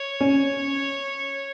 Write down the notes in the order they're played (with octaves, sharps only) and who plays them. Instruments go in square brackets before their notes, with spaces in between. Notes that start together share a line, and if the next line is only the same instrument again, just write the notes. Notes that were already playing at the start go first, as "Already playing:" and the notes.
Already playing: [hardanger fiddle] C#5
[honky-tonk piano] C#4